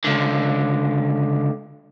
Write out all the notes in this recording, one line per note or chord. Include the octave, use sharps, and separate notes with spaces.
C#2 D3